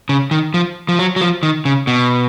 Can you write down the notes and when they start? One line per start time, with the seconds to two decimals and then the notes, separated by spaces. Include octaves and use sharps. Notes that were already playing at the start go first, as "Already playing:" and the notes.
0.09 C#3
0.31 D#3
0.54 F3
0.89 F3
0.99 F#3
1.16 F#3
1.21 F3
1.43 D#3
1.65 C#3
1.87 B2